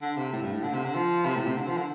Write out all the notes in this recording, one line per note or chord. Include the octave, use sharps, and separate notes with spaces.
D3
C3
A2
G2
A2
D3
C3
D3
F3
C3
A2
C3
D3
F3
D3